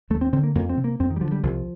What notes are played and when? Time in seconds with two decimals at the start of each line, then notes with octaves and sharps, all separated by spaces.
0.10 D#2 A3
0.21 C4
0.33 D3 C4
0.43 A#3
0.55 F2 A#3
0.70 C4
0.77 C3
0.84 A#3
1.00 F2 C4
1.11 D#3
1.16 G3
1.21 D3 F3
1.32 G3
1.43 C2 F3